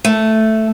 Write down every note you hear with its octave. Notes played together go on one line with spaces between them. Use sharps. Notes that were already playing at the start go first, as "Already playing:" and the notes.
A3